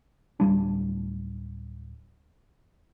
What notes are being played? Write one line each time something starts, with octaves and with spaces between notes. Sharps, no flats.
D1 F#2 G3 D4